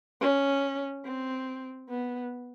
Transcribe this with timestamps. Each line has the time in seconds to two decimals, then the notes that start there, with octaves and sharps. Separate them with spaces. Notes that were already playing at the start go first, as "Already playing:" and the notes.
0.21 C#4
1.05 C4
1.89 B3